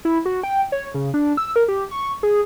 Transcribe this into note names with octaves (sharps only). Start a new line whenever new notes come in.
E4
F#4
G5
C#5
C#3
D4
E6
A#4
G4
C#6
G#4